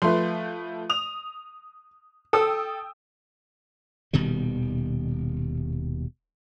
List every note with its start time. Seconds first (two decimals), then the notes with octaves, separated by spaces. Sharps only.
0.02 F3 A3 B4 C6
0.89 D#6 F7
2.33 A4 G5 D#6 E6
4.13 D#1 B2 D#3 G3